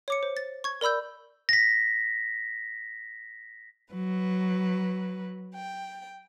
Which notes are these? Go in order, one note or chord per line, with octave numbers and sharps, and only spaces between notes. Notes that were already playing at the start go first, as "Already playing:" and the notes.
C#5 D6 C#7
C5
A6
C#6 G#6
A#4 D5 B5 E6 G6
A#6 B6
F#3 B4
G5